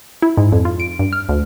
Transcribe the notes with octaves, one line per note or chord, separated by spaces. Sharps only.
E4
G#2
F2
F4
D7
G2
F6
D2